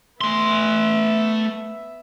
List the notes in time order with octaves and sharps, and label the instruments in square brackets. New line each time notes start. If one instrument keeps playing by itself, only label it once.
[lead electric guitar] A3 C6 [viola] B3 E5